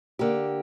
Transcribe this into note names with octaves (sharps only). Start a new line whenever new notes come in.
D3 A#3 G4